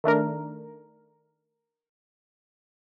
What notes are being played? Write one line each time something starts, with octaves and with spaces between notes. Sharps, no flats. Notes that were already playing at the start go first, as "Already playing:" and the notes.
D#3 A3 D4 A#4